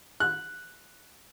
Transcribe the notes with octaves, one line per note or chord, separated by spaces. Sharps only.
F#6